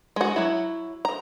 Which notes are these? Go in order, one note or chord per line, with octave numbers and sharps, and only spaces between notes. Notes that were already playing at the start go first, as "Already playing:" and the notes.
G#3 F#4
F#3 E4
A#5